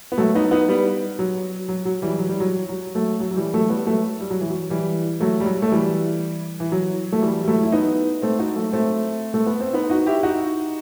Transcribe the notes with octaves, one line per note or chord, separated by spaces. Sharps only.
B3
F#3 A3
B3 D#4
B3 D#4
G3 B3
F#3
F#3
F#3
E3 G3
F#3
G3
F#3
F#3
F#3 A3
F#3
F#3
E3 G3
F#3 A3
G3 B3
F#3 A3
G3
F#3
E3
F#3
E3 G3
F#3 A3
G3
F#3
A3
E3 G3
E3
F#3
A3
E3 G3
G3
F#3 A3
E4
B3 D#4
A3 C4
D#4 F#4
F#3 A3
A3 C4
A3
B3
C4
B3 D#4
D#4 F#4
E4 G4
D#4 F#4